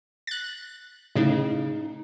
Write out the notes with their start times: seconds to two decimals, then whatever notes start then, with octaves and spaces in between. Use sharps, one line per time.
0.27 F#6 A6
1.16 A2 C#3 D#4